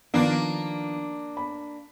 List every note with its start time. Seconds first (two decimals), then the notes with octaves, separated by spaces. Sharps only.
0.14 D#3 F3 A#3 B3 D4
1.37 B5